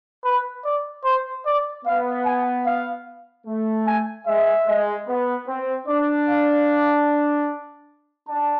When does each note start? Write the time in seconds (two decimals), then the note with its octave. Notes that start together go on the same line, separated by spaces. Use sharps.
0.24 B4
0.64 D5
1.04 C5
1.46 D5
1.85 B3 F5
2.26 G#5
2.66 F5
3.46 A3
3.87 G#5
4.27 G#3 E5
4.67 G#3
5.07 B3
5.47 C4
5.87 D4 D5
6.28 F5
8.28 D4 A5